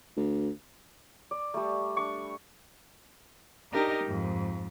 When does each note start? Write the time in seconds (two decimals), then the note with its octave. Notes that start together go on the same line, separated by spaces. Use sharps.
0.17 D2
1.31 D5
1.54 G3 A3
1.97 D4 C#6
3.71 D4 D#4 G4 A#4 D#5
4.03 F2 G#2